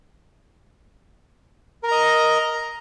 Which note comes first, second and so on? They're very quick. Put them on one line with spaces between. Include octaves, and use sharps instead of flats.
A#4 A#5 D#5